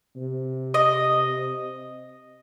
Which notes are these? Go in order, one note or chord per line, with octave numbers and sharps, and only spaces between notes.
C3
D#5